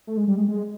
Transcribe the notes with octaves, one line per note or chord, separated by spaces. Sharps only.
A3
G#3
G3
G#3
G#3